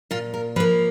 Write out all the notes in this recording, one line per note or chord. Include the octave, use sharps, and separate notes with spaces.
A#2 F4
A#4
F3 A#3 B4